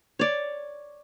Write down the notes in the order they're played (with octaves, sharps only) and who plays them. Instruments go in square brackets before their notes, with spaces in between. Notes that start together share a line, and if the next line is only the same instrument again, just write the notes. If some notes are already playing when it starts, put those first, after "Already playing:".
[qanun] C#5 D5